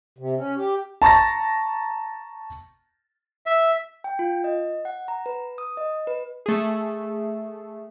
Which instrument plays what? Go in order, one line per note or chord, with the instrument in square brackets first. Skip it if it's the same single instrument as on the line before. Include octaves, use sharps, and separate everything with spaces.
[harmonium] C3
C#4
G4
[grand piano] A5 A#5 C#6 A6 A#6
[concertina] E5
[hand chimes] G5
F4
D#5
F#5
A#5
B4
D#6
D#5
B4
[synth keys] A3 G#4